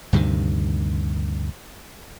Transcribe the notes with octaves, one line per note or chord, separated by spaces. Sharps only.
D2 G2 C3 D#3